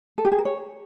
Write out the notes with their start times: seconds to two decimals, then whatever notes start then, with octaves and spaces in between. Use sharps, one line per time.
0.18 A4
0.25 G4
0.32 G#4
0.38 A#4
0.45 C#5